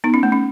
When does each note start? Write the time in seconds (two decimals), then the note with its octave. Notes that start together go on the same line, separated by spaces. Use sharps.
0.04 B3 D#4
0.14 C#4
0.23 A3
0.32 C#4